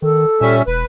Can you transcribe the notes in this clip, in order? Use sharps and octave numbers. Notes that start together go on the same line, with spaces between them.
D#3 A4
A#2 G3 C#4 E5
E1 B4